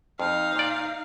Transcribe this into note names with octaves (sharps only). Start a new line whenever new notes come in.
F2 D#4 F5
A#2 D5